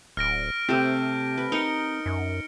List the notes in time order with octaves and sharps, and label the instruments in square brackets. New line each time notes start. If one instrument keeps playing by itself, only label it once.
[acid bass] D1 [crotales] F6 A#6 D7
[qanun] C3 A3 G4 [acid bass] C4
[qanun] B4
[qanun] D#4 A#4 [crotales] C#7 G7
[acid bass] F#2